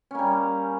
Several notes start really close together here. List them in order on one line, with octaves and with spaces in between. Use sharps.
C#4 A#3 G3